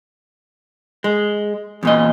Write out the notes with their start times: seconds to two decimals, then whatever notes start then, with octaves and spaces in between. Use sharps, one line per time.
1.04 G#3
1.83 E2 A#2 D#5